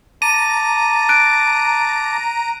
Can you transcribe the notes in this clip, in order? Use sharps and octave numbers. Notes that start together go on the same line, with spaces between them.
A5 A#5 D6 D#7
F#6 D7